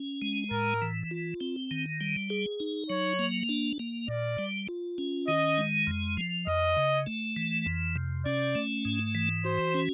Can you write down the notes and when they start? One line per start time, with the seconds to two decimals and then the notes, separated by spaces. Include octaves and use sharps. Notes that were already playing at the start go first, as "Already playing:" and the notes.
Already playing: C#4
0.22 G#3
0.51 A2 A#4
0.82 E3
1.11 F4
1.40 C4
1.71 D#3
2.01 G3
2.30 G#4
2.60 D#4
2.90 F#3 C#5
3.19 A#3
3.49 D4
3.79 A#3
4.08 A#2 D5
4.39 G3
4.68 F4
4.98 C#4
5.28 D#3 D#5
5.58 G#3
5.87 F2
6.17 F3
6.47 F2 D#5
6.77 C#3
7.07 A3
7.37 E3
7.66 F2
7.96 C3
8.25 C#4 D5
8.55 A3
8.85 G#2
9.15 E3
9.45 F#4 C5
9.74 C#4